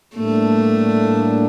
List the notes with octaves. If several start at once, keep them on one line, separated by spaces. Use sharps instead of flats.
A2 G3 A3 A#3 D4